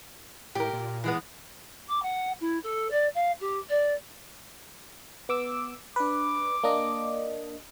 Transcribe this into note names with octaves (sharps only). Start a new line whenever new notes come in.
A2 G4 A#4
A#2
E3 G#3 B3
D6
F#5
E4
A4
D5
F5
G4
D5
B3 D6 E6
D4 B4 D6
A#3 D4 D#5